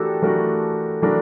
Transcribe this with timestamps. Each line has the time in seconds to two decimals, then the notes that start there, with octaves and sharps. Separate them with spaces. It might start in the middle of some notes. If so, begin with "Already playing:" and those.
Already playing: E3 A3 D4 F#4 G4 A4 A#4
0.22 E3 A3 D4 F#4 A#4
1.02 E3 A3 D4 F#4 A#4